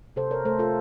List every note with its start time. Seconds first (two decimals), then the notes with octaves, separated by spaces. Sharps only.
0.16 C3 A4 C5
0.31 A#4 C#5
0.45 A3 A4 C5
0.59 F4 A4